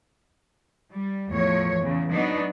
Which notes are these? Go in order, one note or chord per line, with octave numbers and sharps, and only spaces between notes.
G3
E2 A2 F3 C#5
E2 C#3
F#3 B3 D4 D#4